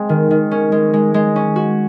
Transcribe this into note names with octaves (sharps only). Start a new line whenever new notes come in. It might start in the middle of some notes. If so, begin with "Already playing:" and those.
Already playing: G#3 C4
D#3
D#3
C#4
G#3
G#3
G#3
C#4
F#4